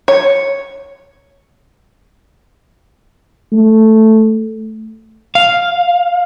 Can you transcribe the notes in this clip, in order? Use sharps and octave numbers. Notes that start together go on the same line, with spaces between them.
C#5
A3
F5